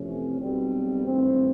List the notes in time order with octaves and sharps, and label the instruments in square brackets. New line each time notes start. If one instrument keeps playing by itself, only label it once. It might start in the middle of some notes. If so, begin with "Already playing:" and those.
Already playing: [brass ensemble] F2 C3 E3 A3 C#4
B1 B2 G3 C4
G#1 G2 E3 A3 C4